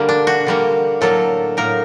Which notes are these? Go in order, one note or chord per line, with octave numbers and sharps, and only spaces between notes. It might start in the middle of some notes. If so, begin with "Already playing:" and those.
Already playing: D3 G3 A#3
D4
F#4
D3 G3 A#3
A2 F#3 A#3 A4
A2 F#3 A#3 A#4